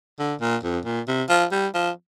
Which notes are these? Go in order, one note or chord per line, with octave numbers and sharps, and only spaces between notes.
D3
A#2
F2
A#2
C3
F3
G3
F3